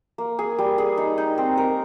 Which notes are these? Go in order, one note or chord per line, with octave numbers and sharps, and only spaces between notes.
A#3
G#4
G3
G#4
D#4
D#4
C4
A#4